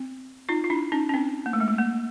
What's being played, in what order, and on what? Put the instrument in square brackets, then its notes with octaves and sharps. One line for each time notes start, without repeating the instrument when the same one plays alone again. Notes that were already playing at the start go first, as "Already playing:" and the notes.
Already playing: [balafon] C4
D#4 F4
F4
D4 E4
C#4 D#4
C#4
C4 D4
A#3
A3
G#3
A3
A#3